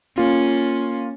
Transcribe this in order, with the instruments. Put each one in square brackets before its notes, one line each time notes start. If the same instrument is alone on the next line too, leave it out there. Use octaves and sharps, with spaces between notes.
[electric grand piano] A#3 F4 [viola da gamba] C#4